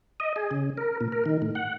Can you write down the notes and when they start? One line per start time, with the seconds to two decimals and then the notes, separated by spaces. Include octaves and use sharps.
0.20 D#5
0.36 G#4
0.51 C#3
0.78 A#4
1.01 A#2
1.12 A#4
1.26 D#3
1.42 A2
1.55 F#5